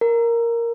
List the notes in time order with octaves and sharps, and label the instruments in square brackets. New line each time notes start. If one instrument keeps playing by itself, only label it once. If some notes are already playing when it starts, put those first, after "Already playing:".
[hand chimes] A#4